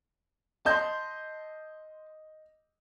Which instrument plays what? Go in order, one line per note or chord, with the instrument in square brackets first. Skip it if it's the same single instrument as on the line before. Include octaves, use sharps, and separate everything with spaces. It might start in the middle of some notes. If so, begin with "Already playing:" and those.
[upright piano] D#5 G6 [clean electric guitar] A5 C6